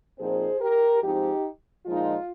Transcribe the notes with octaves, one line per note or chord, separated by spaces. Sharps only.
A#2 F3 C4 D#4 G#4 C5
G4 A#4
G#2 F3 C4 D#4 G4
A#2 F3 G#3 D#4 F4